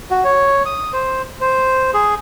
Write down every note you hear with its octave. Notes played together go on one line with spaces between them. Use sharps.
F#4
C#5
D#6
C5
C5
G#4